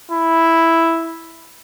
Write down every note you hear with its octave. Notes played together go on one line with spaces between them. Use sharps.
E4